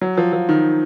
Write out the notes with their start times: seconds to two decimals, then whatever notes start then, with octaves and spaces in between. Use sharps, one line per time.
0.02 F#3
0.17 F3
0.33 F3
0.49 D#3